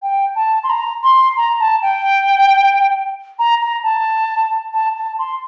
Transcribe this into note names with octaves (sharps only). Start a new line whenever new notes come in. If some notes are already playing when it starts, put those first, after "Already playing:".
G5
A5
C6
A#5
C6
A#5
A5
G5
A#5
A#5
A5
A5
A5
C6